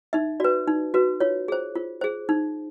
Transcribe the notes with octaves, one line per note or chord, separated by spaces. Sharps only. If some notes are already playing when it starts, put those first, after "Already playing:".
D#4 E5
F#4 B4 D5
D#4
F#4 B4
F4 C#5
G#4 C5
F4
G#4 C5
D#4